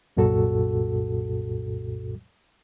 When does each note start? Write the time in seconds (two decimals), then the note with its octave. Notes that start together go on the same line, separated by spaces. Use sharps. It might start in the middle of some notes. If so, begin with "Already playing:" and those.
0.17 C2 F#2 A#2 F#4 A4